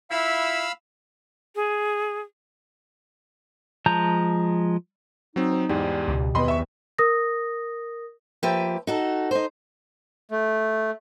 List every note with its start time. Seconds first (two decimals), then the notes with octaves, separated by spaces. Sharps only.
0.11 E4 F4 E5 F5 B5 E6
1.56 G#4
3.86 F3 G#3 A5 A#5 G6
5.36 F#3 C4 D#4
5.52 C5
5.69 E2 G#2 G3
6.08 C#2 B2
6.35 D#2 A3 B3 C4 B4 D#5 B5 C6
6.48 E5 C#6
6.98 A#4 D#6 A#6
8.43 F3 A#3 G4 B4 E5
8.87 D#4 F#4 A4
9.31 D#4 C5
10.31 A3